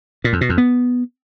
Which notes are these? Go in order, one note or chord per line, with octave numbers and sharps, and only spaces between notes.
A#2
F2
B2
F2
B3